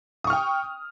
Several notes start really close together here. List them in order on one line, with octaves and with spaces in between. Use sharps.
D#6 C#6 F6 G5